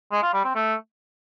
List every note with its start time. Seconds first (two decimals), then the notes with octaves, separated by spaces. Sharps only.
0.12 G#3
0.23 F4
0.34 G3
0.45 C4
0.55 A3